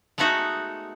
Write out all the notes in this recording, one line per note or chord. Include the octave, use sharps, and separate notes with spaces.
G#3 A3 B3 D#4 F#4